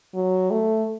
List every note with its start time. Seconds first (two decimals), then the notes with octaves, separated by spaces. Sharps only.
0.15 F#3
0.51 A3